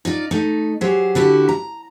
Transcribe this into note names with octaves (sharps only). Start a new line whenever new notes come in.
D#4 F4 D5
A3 D#4
F#3 G4 G#4 C5
D3 E4 F#4 G4
A#5